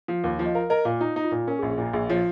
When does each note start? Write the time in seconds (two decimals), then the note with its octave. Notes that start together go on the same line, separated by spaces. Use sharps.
0.08 F3
0.24 D#2
0.39 F3
0.46 D#5
0.55 A#4 F5
0.70 A#4 D#5
0.85 A#2 F5
1.01 D#4 F4
1.16 D#4
1.24 F4
1.32 A#2
1.48 C#4 A#4
1.59 G#4
1.63 A#1
1.70 G#4
1.78 A#2 F4
1.93 A#1 G#4
2.10 F3 C#5